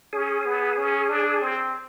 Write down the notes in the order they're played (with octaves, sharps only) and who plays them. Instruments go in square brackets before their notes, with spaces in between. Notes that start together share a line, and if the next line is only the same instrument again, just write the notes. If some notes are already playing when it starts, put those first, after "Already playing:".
[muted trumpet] C#4 [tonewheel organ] G#4
[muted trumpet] B3
C#4
D4
C4